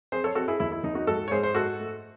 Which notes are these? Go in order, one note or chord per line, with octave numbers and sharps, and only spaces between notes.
C4 G#4 C5
A4 C#5
C4 F#4 A4
E4 G#4
D#2 E4
E4
D#2 D#4
D#4 F#4
G#2 F#4 A4
C#5
G#2 G#4 C5
C5
G#2 F#4 A4
A3